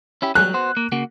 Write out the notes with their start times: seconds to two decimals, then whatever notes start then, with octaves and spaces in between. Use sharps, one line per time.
0.22 C#4 E4 G4
0.35 F#3 G3 F#6
0.54 B3 F#4 C5
0.77 A#3
0.92 C#3 A#3 F#4